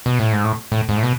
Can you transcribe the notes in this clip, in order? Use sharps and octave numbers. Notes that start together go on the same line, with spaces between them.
B2
A2
G#2
A2
A2
G#2
A2
B2